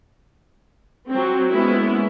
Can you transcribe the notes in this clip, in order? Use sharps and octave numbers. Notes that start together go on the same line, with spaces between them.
F#3 C4
G#3 A#3 B3 C#4 E4